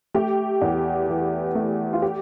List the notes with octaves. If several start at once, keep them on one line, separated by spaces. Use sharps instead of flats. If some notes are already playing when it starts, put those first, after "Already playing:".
A3 G4
E2
E3
A3
F4
G4